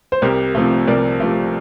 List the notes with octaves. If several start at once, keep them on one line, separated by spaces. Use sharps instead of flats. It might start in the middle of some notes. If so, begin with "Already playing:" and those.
C5
C2 G4 A#4
C3 F3 A3
C2 A#4 D5
C3 F3 A3